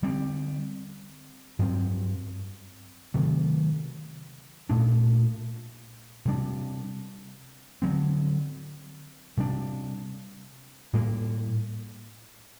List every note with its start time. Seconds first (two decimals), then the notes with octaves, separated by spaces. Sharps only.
0.02 D3 G3 C4
1.59 G2 F#3 C4
3.14 C3 D#3 F#3 A3
4.69 A#2 A3 D4
6.25 C3 G3 D4
7.82 D3 F#3 C4
9.37 C3 G3 D4
10.93 A2 G3 A#3